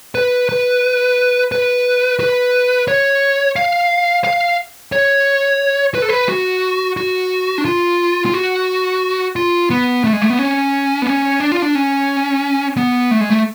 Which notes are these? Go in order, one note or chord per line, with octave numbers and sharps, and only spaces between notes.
B4
B4
B4
B4
C#5
F5
F5
C#5
B4
A4
B4
F#4
F#4
D4
F4
F4
F#4
F4
B3
A3
G#3
A3
B3
C#4
B3
C#4
D4
F4
D4
C#4
B3
A3
G#3
A3